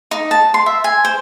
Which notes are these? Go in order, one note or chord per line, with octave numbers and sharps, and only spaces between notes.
D#4
A5
C6
E5
G#5
C5